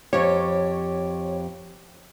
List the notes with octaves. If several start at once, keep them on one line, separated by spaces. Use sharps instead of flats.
F2 G4 C#5